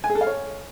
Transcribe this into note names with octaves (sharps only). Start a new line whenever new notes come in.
G#5
G#4
A4
F5
C#5